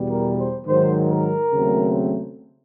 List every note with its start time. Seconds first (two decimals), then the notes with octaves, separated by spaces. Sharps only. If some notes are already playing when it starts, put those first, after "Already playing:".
Already playing: E2 B2 G3
0.10 A#4
0.38 C5
0.67 G#2 D#3 F#3 C5
1.09 A#4
1.52 D#2 C#3 F#3 A3 C4